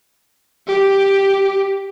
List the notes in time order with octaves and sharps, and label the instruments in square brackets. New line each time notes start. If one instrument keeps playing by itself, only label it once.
[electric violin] G4